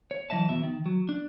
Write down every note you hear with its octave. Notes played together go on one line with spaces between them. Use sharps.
C#5
E3 F#3 D#5 E5 A5
E2 B2 E5
D#3
F#3
D4